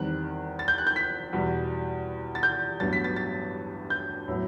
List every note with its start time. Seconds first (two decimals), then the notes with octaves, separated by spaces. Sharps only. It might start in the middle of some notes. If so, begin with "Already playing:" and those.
Already playing: E2 D#3 G3 C4 F#6
0.59 A6
0.68 G6
0.78 F#6
0.87 G6
0.96 B6
1.33 E2 B2 G3
2.35 A6
2.43 G6
2.80 A1 G2 F#3 B3 A6
2.93 B6
3.04 A6
3.16 A6
3.90 G6
4.28 A2 F#3 B3